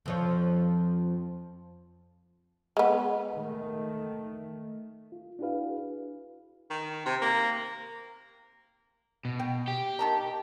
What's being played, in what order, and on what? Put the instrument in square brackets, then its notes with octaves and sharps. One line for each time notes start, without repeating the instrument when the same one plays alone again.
[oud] F2 F3 C#5
[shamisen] G#3 B3
[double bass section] D#3 A3
[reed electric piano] F4
D4 E4 F#4 G#4 B4 F5
[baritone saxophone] D#3
C3
A#3
[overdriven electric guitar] B2
[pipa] G5
[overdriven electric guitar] G4
[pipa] D#3 A5 A#5